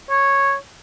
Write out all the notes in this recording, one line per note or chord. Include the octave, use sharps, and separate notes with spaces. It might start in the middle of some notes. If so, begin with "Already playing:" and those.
C#5